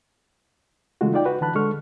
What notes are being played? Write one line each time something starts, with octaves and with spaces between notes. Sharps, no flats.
C#3 E3 G#3 A3 F4 F#4
D#4 F4 D5 G5
F#4 B4
D3 E3 A5 B5 F#6
D3 G#3 A4 C#6 F6